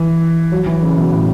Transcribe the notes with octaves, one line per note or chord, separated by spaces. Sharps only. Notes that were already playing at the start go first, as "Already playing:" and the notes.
Already playing: E3
F#3
E3
C#3
B2
A2